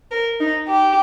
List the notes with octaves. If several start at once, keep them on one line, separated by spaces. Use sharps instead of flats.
A#4
D#4
G4